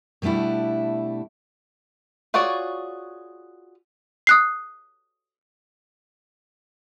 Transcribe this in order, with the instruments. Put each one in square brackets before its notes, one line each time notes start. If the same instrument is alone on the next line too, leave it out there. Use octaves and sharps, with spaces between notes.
[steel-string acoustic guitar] B2 G3 A3 D4 E4
[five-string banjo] F4 F#4 G#4 C#5 D5
[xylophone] D#6 F#6 C7